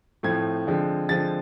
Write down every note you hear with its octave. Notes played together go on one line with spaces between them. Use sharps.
A2 F3 A3 C4 G#6
D3 F3 G#3 C4
D3 F3 G#3 C4 A6